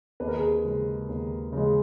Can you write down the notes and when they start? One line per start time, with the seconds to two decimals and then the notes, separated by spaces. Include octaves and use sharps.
0.20 D#2 B4
0.28 A#4
0.36 G#4
0.44 A#4
0.64 C#3 G#3
1.09 D#2
1.52 C#3 G#3